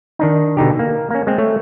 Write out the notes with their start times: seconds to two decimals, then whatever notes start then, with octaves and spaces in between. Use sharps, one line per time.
0.19 D#3 D4 D#4
0.57 B2 D3 D#4 G4
0.79 A#3
1.11 A#3 C#4
1.27 G#3 C4
1.38 A3 C#5